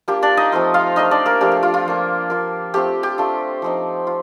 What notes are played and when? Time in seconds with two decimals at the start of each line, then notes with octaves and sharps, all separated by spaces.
0.08 A#3 D4 F4 G4
0.22 D4 D5
0.37 D#4 D#5
0.52 F3 A3 C4 F4
0.74 F4 F5
0.96 A3 D4 D#4 F4 D#5
1.11 D4 D5
1.26 A#3 A#4
1.41 F3 A3 D4 G4
1.52 G4
1.63 F4
1.74 F4
1.85 F3 A#3 D4
2.30 A#3 D4 F4
2.74 A3 C4 F4 G4
3.03 G4
3.18 A3 D4 F4
3.62 F3 C4 D#4
4.07 F4